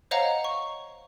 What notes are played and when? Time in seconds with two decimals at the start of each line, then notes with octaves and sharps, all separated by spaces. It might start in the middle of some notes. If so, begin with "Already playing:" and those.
0.11 C5 C#5 D#5 F5 F#5 A#5
0.44 C#6